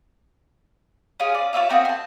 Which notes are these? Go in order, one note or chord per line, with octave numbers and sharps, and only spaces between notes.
C#4 F4 G#4
D5
F4 C#5 E5 F5
A3 C4 F#4 D#5
A5 C6